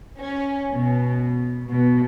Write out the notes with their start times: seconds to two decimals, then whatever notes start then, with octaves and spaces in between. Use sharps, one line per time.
0.19 C#4
0.70 B2
1.67 B2